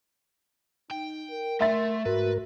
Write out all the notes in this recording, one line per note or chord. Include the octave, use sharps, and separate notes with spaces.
D#4 G5
A#4
A3 E5 C6 A6
G#2 F#4 A#4 B4